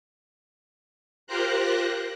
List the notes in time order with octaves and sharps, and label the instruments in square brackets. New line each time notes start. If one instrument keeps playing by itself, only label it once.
[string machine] F4 G4 A#4 C5 A#5 F#6